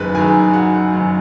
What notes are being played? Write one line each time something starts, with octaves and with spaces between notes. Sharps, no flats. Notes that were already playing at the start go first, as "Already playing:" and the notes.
Already playing: F#1 F#2 D#3 G#4 B4 B5
F#1 F#2 D#3 G#4 G#5
F#4 F#5
F#1 F#2 D#3